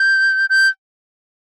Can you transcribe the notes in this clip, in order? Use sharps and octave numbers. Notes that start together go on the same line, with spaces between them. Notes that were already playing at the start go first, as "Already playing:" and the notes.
Already playing: G6
G6